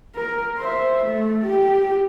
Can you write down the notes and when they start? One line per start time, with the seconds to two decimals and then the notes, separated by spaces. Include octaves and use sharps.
0.15 A#4
0.59 C5 E5
1.05 A3
1.45 G4